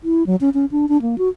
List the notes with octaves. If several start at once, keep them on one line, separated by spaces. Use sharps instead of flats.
E4
F#3
C#4
C#4
D4
D4
A#3
F#4